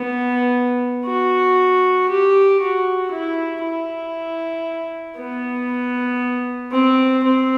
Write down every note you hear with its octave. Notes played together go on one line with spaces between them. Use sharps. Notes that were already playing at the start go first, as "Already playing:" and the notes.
Already playing: B3
F#4
G4
F#4
E4
E4
B3
C4
C4